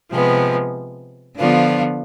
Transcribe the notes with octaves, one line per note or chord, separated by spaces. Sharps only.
C3 F3 G#3 B3
D3 F3 B3 D4 F4